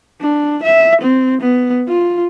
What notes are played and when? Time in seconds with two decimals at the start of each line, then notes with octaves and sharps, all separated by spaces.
0.21 D4
0.63 E5
1.01 C4
1.41 B3
1.88 F4